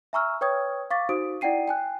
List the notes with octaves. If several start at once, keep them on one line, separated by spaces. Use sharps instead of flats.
E5 G#5 A#5 C#6 E6 F6
B4 C#5 G5 C#6 D#6 G#6
F5 C#6 D6 A6 B6
D#4 F#4 C5 D#6 D7
E4 D5 F#5 G5 C7 D#7
G5 G#5 F#6